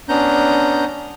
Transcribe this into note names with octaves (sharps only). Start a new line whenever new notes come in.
B3 C#4 D4 A#5 G6